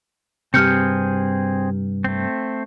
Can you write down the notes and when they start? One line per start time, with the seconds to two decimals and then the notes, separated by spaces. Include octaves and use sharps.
0.54 G2 C3 C4 G#4 F6 G6 C#7
2.04 A3 C4